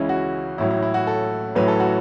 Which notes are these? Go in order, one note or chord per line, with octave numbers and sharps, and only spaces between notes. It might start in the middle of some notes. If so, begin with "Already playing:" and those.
Already playing: C#2 C#3 E3 C#4 E4
F#4
A1 A2 F#3 E4
E4
E4
F#4
A4
A1 A2 F#3 B4
A4
F#4